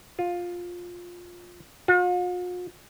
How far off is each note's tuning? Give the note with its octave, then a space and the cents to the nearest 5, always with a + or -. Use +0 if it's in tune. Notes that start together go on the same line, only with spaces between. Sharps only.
F4 +10
F4 +45